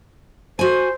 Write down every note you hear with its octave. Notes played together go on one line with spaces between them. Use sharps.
F#4 C5 G#5